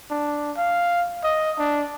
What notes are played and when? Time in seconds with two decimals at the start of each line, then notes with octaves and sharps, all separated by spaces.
0.11 D4
0.58 F5
1.24 D#5
1.59 D4